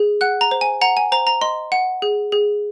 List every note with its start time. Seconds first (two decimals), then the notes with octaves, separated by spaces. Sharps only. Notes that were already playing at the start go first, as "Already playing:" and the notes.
Already playing: G#4
0.21 F#5 F#6
0.41 A#5
0.51 C5
0.61 G#5
0.81 F#5 A#5
0.97 G#5
1.12 C5 A#5
1.27 A#5
1.42 D#5 C6
1.72 F#5
2.02 G#4
2.32 G#4